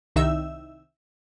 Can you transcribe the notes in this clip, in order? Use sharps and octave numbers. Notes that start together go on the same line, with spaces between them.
C2 D#3 D#4 E5 E6